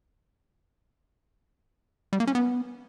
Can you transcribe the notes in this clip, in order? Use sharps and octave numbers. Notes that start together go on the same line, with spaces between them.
G3
A#3
C#4
B3